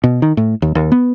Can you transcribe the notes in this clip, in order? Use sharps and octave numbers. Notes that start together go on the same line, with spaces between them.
B2
D#3
A2
D#2
D#2
B3